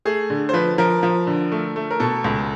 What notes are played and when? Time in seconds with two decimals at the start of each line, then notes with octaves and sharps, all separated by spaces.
0.05 A3 G#4
0.30 D3
0.49 C5
0.53 F3 B4
0.78 F3 A#4
1.03 F3
1.27 D3
1.52 A3
1.76 A3
1.91 A#4
2.00 B2 A4
2.24 C#2